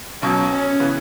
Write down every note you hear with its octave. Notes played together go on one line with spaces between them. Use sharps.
B1 B2 F#3 C#4
C#4
C#3 E3 B3